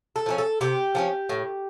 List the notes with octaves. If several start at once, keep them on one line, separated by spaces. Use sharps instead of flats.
A4
F3 A3 C#4
A4
C3 G4
F3 A3 C#4
A2